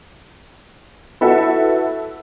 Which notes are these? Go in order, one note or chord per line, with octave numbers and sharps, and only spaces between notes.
E4 F#4 A4 B4 E5 F#5